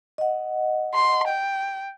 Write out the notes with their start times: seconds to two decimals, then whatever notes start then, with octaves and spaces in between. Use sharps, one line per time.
0.18 D#5 F#5
0.94 C6
1.28 G5